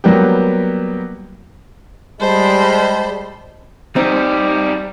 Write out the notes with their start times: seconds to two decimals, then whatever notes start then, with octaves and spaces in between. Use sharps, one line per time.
0.04 F#3 G3 A#3 B3 G4
2.21 G3 G#3 C5 A5 B5
3.96 G3 C4 D#4